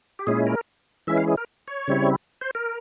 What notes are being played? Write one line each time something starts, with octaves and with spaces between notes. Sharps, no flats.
G4
A#2 G#3 C#4 E4 G#4
A#4
E3 G#3 C#4 E4 E5
F5
G#4
A#4
C#5
C#3 G3 C4 E4
C5
A#4